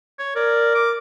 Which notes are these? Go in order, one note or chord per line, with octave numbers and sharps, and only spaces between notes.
C#5
A#4 D5
D6